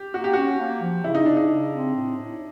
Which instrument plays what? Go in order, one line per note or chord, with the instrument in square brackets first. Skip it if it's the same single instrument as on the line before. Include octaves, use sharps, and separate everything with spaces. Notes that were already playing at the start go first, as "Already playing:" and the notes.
Already playing: [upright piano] G4
[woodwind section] A#3 [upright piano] F#4
[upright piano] G4
[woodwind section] C#4 [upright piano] F#4
[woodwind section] A#3
F3
[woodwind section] C#3 [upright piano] E4
[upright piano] D#4
[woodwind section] C#3 [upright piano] D4
[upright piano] D#4
[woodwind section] C#3
C4
A2
A2